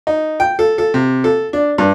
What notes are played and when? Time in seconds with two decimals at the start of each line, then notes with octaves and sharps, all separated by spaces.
0.07 D#4
0.40 G5
0.59 A4
0.78 A4
0.94 C3
1.24 A4
1.53 D4
1.78 G2